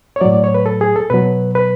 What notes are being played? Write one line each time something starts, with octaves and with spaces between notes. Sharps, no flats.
C#5
A2 F#3 D5
D5
C#5
B4
A4
G#4
A4
B2 F#3 B4
B4